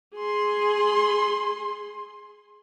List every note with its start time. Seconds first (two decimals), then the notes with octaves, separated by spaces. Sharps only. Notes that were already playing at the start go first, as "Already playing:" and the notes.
0.15 G#4 C6